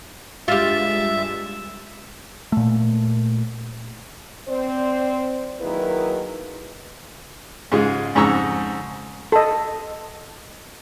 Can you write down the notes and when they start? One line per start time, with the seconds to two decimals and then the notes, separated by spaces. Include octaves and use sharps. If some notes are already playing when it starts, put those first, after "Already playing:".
0.48 G2 G#3 F4 G4 E5 A6
2.52 A#2 A3
4.48 C4 C5 D5
5.60 D#3 F#3 A#3 E4 G#4 B4
7.72 G#2 C#3 G#3 F4
8.15 F2 G#2 C#3 A#5 C#6 E6
9.32 A4 D#5